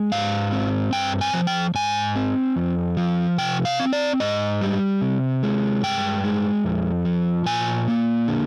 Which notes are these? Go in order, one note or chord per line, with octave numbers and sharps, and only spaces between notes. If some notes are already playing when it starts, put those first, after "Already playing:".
Already playing: G#3
G#2 F5
C4
G2 G5
G#5
F3
G5
G#2 G#5
C4
F2
F3
C3 G5
F5
C4
D5
G#2 D#5
G3
C3
G#3
G2 G5
G#3
F2
F3
A#2 G#5
A#3
D3